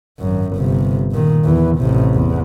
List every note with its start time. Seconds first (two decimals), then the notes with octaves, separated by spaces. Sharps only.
0.19 G#1 F#2
0.52 G1 C3
1.12 A#2 D#3
1.45 E2 E3
1.78 A1 C3
2.14 E2